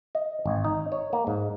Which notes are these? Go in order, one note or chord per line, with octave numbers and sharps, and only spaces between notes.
D#5
G#1
D#4
C#5
A#3
G#2